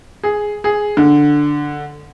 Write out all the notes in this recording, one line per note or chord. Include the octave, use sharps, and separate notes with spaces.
G#4
G#4
D3